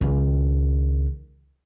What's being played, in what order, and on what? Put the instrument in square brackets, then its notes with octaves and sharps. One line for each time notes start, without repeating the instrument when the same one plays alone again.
[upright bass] C#2 D#3